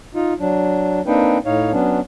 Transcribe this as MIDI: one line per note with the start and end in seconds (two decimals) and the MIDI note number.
0.15 0.34 63
0.15 0.34 65
0.40 1.01 54
0.40 1.01 62
1.07 1.38 58
1.07 1.38 60
1.07 1.38 62
1.07 1.38 63
1.07 1.38 71
1.07 1.38 79
1.46 1.72 45
1.46 1.72 63
1.46 1.72 73
1.46 1.72 77
1.72 2.00 54
1.72 2.00 59
1.72 2.00 61
1.72 2.00 62